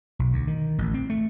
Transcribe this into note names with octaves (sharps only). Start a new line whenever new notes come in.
B1
D2
D#3
A1
C4
A3